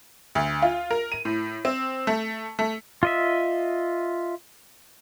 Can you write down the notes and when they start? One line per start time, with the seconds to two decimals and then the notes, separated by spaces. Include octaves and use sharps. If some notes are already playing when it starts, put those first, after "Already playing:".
0.35 D2
0.62 F4
0.91 A#4
1.12 D#7
1.25 A2
1.65 C4
2.07 A3
2.59 A3
3.03 F4 D#5 E5